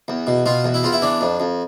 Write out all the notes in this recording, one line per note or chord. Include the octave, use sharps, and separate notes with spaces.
E2
B2
B2 F4
E2
E4
E2 F4
E4
E3 D4
F2
F2